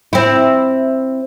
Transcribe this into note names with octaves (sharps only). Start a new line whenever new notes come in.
C4 E4